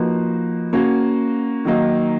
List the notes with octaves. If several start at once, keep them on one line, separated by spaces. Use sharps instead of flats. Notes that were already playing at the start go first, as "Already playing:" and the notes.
Already playing: F3 A#3 D#4 F#4 B4
A#3 C#4 F#4
D#3 F#3 A#3 D#4